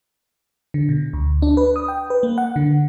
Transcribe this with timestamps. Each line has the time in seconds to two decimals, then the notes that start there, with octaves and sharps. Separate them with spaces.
0.74 D3
0.89 B2
1.13 D2
1.42 D4
1.57 B4
1.76 D#6
1.88 G5
2.10 B4
2.23 A#3
2.38 F#5
2.56 D3